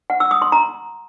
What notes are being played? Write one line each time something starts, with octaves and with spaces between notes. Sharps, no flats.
F#5
E6
D#6
C6
A#5